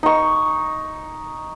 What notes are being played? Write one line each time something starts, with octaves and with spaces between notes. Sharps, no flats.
D#4 C#6